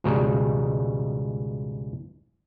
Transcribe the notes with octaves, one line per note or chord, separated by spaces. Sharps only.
C#2 G#2 B2 D#3 G3 G#3